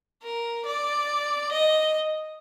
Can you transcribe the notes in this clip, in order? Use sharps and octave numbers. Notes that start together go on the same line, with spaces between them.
A#4
D5
D#5